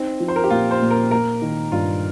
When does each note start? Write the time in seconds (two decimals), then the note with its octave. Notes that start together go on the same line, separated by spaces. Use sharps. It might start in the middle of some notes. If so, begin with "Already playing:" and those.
Already playing: C4 D#4
0.20 F3
0.28 C5
0.36 A#4
0.44 G4
0.50 A#2 F4
0.71 C5
0.82 A#2
0.91 A#4
1.11 A#3 A#4
1.42 D#3
1.72 G2 F4